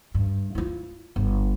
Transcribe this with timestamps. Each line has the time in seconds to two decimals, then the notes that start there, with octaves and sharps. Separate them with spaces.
0.15 G2
0.55 E4 F4
1.16 G1